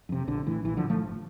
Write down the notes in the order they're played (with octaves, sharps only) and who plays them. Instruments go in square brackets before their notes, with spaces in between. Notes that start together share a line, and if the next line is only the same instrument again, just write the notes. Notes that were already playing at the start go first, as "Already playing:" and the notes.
[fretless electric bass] F2 C3
A#1 D3
A2 E3
A#1 E3
D3 F3
A2
F3 A3
G1